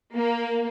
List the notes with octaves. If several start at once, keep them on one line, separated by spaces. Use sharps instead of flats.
A#3